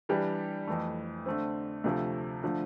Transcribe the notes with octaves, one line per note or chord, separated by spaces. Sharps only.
E3 G3 D4 G4
F2 E3 A3
D3 A3 C4
D2 C3 F3 A3
D3 F3 A3